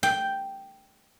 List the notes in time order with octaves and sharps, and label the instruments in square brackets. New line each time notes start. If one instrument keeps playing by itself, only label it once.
[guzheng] G5